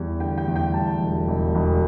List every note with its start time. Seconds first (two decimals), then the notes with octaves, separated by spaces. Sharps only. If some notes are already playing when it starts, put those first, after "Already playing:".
Already playing: E2 G3
0.20 D3 G5
0.38 G5
0.47 E2
0.56 G5
0.73 G3 A5
1.01 E1
1.28 E1
1.55 E1